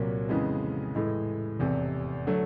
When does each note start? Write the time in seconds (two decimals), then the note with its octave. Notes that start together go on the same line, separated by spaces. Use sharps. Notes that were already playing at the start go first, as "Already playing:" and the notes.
Already playing: C2 A#2 F#3 A#3
0.29 F2 C#3 E3 G#3 B3
0.95 A2 E3 G#3
1.59 F1 E2 C3
2.26 D3 F#3 A3